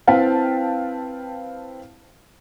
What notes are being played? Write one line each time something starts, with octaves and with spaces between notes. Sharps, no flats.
C4 E4 B4 F5 G5 A5